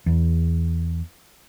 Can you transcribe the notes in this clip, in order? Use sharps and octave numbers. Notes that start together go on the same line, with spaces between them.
E2